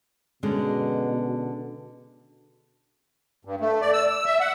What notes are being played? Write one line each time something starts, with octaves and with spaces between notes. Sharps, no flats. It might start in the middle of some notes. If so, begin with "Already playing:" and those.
B2 D3 G#3 C#4
G2
A3
D5
E6
E6
E5
F#5